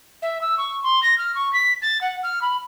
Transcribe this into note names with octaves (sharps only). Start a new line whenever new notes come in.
E5
E6
C#6
C6
A#6
F6
C#6
B6
A6
F#5
F6
B5